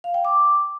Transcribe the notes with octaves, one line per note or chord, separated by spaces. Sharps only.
F5
G5
D6